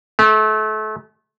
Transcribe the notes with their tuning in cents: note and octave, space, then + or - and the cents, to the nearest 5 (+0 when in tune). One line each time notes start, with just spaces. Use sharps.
A3 -30